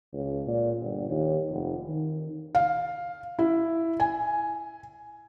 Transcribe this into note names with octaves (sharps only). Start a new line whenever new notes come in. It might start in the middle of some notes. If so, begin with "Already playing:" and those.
C#2
A#2
G1
D#2
F1
D#3
F5
E4
G#5